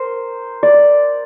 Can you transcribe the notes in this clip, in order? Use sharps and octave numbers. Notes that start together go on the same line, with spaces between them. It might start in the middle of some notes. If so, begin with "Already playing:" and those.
Already playing: A#4 C5
D5